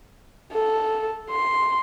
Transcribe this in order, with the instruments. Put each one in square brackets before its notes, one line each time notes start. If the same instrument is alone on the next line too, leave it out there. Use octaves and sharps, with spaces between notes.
[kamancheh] A4
C6